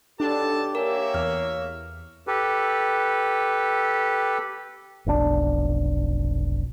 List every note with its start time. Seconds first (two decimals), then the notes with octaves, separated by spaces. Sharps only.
0.20 B1 D4 G4 A4 A5
0.75 A#3 A#4 C#5 E5 G#5
1.14 E2 F6
2.27 G4 A4 B4
5.06 F1 B1 G#2 D4